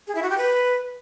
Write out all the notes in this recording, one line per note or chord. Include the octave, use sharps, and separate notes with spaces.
G#4
E4
F#4
G4
B4